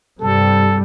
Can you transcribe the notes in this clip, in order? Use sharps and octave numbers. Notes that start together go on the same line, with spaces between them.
G2 C3 G3 A4